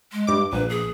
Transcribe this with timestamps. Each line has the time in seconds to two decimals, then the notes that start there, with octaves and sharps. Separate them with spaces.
0.12 G#3
0.27 G2 D6
0.53 A#1 B4
0.69 G#4